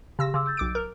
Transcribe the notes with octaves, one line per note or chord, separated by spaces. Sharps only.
C#3 G4 C6 E6 A#6
C#3 C6 D6 E6
E6 G6 A6
B1 D6 D7
A#4